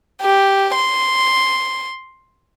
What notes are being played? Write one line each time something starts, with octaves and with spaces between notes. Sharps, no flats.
G4
C6